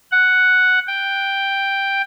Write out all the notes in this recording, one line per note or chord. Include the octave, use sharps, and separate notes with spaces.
F#5
G5